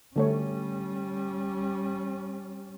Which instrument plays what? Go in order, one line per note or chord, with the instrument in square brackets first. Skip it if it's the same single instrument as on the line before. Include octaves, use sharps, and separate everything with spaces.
[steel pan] D3 A3 C#5 [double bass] G3 C#4